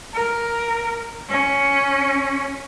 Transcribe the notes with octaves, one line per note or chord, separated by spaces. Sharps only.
A#4
C#4